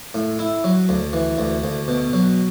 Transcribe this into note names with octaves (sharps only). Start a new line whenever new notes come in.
A2
E4
F#3
D2
E3
D2
D2
B2
F#3